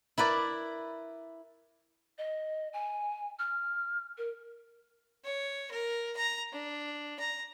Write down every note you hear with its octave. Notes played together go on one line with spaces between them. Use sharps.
E4 A#4 B4 D5
D#5
G#5
F6
A#4
C#5
A#4
A#5
D4
A#5